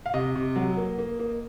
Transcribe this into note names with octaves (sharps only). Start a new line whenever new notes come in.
F5
C3 D#5
C3
F#3
A#3
A#3
A#3